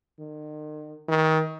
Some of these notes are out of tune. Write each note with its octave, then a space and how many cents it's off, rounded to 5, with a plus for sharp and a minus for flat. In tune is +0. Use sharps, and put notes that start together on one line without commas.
D#3 -40
D#3 +25